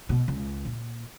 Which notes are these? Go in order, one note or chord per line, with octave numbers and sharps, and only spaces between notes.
B2
C#2
A#2